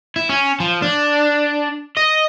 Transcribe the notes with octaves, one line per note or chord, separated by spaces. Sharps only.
E4
C#4
F3
D4
D#5